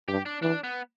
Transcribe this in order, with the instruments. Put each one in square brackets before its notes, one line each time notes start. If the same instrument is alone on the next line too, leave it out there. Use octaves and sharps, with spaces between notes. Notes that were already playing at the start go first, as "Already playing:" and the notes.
[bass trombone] G2 [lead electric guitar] G4
[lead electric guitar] D4
[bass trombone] E3 [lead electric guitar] D4
[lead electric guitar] B3